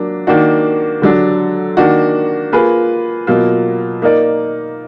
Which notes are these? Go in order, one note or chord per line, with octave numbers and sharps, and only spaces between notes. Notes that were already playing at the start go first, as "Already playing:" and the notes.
Already playing: F#3 A#3 D4
D#3 A#3 D4 F#4
D3 F#3 D4
D#3 A#3 D4 F#4
A#3 F4 G#4 B4
B2 F#3 A#3 F4
A#3 D#4 A#4 D5